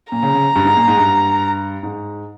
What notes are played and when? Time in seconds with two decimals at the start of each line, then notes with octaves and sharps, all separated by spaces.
0.12 A#2 A#5
0.23 C#3
0.34 C#3
0.56 G2
0.65 G#2
0.77 A#2
0.88 G#2
0.98 G2
1.83 G#2